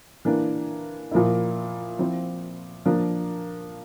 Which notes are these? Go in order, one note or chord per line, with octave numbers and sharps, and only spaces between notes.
E3 A#3 D4
A#2 F3 A#3 E4
F3 C4 E4
F3 A#3 D4